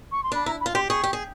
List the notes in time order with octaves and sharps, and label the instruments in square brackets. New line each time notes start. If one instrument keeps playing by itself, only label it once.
[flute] C#6
C6
[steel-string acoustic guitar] D4 [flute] B5
[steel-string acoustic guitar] E4 [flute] A#5
[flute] B5
[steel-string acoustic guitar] F4
[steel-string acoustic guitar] G4 [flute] C6
[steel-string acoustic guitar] G#4 [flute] C#6
[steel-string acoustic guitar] G4
G#4